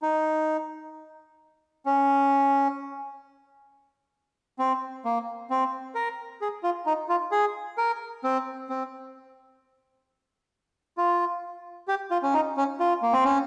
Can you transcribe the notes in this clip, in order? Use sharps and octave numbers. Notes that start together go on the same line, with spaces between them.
D#4
C#4
C4
A#3
C4
A#4
G#4
F4
D#4
F4
G#4
A#4
C4
C4
F4
G4
F4
C#4
D#4
C#4
F4
A#3
C4
C#4